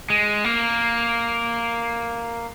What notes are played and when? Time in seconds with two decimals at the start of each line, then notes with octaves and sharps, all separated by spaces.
0.10 G#3
0.45 A#3